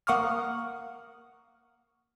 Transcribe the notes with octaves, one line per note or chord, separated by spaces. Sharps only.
A#3 F#5 C#6 D#6 F6